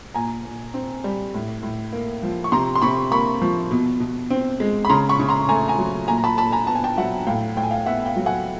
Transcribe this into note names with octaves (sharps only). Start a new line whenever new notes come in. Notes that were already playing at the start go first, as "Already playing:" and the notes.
A#2 G#5 A#5
A#2
C4
G3
A2
A2
A#3
F3
C#6
C3 A#5 C6
C6
C3 B5 C#6
A#3 B5 C#6
F3
B2
B2
C4
G#3
B5
C#3 A#5 C6
B5 C#6
C#3
A#5 C6
A3 G#5 A#5
G#5 A#5
F#3
A#2 G#5 A#5
A#5
A5 B5
A#2 A5 B5
G#5 A#5
B3 A5
G#5
G5 A5
F#3 E5 F#5
A2 F5 G5
A2 G5
G#5
F5 G5
B3 E5 F#5
F5 G5
F#3
F#5 G#5